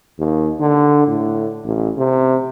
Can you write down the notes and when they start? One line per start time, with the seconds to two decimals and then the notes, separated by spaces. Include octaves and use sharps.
0.19 D#2
0.60 D3
1.08 A2
1.65 A1
1.98 C3